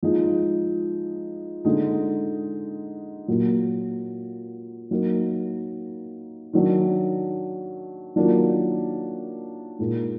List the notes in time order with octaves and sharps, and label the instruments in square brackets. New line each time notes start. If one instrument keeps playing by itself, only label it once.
[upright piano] F3 G#3 D#4
D3 G#3 D#4
A#2 F#3 A#3
F#3 A#3 D#4
D#3 F#3 D4
D#3 F#3 A#3 D4 F4
A#2 G#3 D#4